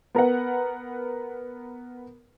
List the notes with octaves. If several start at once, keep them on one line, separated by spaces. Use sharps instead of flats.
B3 A#4 B4 F#5